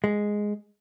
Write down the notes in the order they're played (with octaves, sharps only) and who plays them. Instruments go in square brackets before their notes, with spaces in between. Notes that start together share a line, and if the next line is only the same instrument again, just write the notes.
[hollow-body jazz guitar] G#3